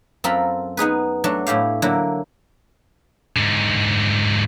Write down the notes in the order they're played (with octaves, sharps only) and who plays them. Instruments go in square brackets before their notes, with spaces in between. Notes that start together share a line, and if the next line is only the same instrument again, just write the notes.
[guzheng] F#2 C4 F4 A4 A#5 B5
B3 D#4 G#4 B4
F#3 A3 D4
A2 E4 G4 F5
D3 F#3 A#3 E4
[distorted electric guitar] G#2 D3